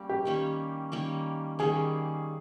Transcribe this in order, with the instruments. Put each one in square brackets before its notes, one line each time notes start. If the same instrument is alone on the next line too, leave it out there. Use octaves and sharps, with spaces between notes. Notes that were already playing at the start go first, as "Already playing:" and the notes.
Already playing: [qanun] G3 A#3 C#4
[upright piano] G4
[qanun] D#3 G3 A#3 C#4
D#3 G3 A#3 C#4
[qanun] D#3 G3 A#3 C#4 [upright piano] G#4